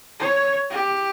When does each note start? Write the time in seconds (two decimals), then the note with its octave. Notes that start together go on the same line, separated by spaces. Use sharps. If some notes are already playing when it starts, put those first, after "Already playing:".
0.19 C#5
0.70 G4